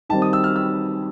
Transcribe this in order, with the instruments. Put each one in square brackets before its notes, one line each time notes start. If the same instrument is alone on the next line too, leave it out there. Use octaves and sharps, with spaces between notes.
[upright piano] D#3 G3 C4 [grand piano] A5
[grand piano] D#6
E6
F6
E6